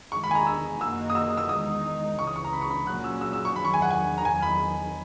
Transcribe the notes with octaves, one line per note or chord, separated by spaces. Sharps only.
E2 D#3 G#3 C#6
B5
G#5
A#5
E6
F#2 D#3 A#3 D#4 F#4 E6
D#6
E6
E6
E2 D#3 G#3 D#4 D#6
C#2 C#3 E3 C#6
D#6
C#6
A#5
B5
C#6
B5
A#2 F#3 C#4 F#4 F#6
E6
E6
E6
C#6
E2 D#3 F#3 B5
C#6
G#5
F#5
G#5
A#5
E2 D#3 F#3 G#5
B5